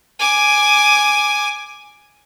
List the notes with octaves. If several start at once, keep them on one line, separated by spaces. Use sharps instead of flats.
G#5 D6